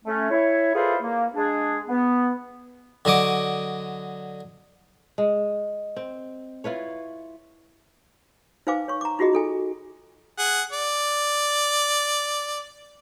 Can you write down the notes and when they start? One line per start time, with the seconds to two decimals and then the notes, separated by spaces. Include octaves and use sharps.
0.05 A3 C#4
0.30 E4 C#5
0.75 E4 F4 G#4 A4 B4 C5
1.02 A#3
1.34 G#3 D4 G#4
1.88 B3
3.05 D3 F#3 D#5 D6
5.18 G#3
5.96 C4
6.64 E4 F4 B4 C#5
8.67 D#4 B4 C5 F5 G#5 D6
8.88 C#5 C#6
9.01 A#5 D6
9.19 D#4 F4 F#4 G#4 D#5
9.33 D#4 A4 G#5
10.38 G#4 F#5
10.73 D5